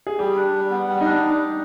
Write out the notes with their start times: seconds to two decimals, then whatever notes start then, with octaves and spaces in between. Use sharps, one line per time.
0.07 G#4
0.19 G3 G4
0.36 D4
0.54 G3
0.70 B3
0.89 G3
1.01 D4 D#4